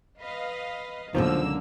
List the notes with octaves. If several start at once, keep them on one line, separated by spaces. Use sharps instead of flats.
B4 D#5 F5
C#2 F#2 B2 D3 D#3 F3 A#3 E6